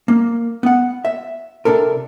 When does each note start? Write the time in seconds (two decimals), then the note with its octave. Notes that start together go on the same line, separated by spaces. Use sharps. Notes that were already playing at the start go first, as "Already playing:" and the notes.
0.08 A#3
0.63 B3 F#5
1.05 E5
1.65 C3 D4 A4 A#4